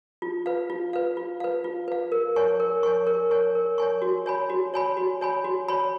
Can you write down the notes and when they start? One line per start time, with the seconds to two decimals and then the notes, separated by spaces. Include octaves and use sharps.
0.22 F4
0.46 B4 F5
0.70 F4
0.93 B4 F5
1.17 F4
1.40 B4 F5
1.64 F4
1.88 B4 F5
2.12 A#4
2.36 C#5 G#5 C#6
2.60 A#4
2.83 C#5 G#5 C#6
3.07 A#4
3.31 C#5 G#5 C#6
3.55 A#4
3.78 C#5 G#5 C#6
4.02 F#4
4.26 C#5 G#5 B5
4.50 F#4
4.74 C#5 G#5 B5
4.97 F#4
5.21 C#5 G#5 B5
5.44 F#4
5.68 C#5 G#5 B5